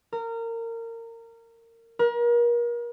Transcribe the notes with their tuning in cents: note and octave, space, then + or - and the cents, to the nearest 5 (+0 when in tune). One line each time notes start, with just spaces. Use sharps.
A#4 -25
A#4 +35